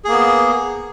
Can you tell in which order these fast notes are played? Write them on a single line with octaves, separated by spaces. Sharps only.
G#4 A#3 B3